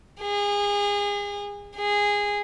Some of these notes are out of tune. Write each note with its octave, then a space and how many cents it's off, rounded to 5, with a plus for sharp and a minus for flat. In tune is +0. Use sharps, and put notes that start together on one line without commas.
G#4 -30
G#4 -15